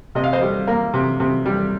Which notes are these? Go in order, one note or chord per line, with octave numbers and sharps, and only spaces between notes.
C3 D#5
F5
C5 D#5
G3
A#3
C3
C3
G3